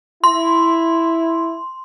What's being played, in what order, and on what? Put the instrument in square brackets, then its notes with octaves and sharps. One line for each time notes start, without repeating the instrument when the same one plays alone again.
[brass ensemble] E4 [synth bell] C6